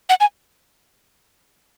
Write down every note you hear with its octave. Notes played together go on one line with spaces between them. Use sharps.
F#5
G#5